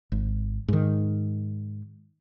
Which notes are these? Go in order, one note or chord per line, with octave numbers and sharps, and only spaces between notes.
G#1
G#2 D#3